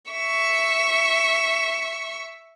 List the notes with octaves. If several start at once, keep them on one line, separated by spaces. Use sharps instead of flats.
E5 C#6